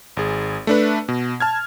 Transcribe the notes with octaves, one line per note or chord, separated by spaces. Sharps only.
G#1 G#4
A3 D4 B4
B2
A5 F6 G#6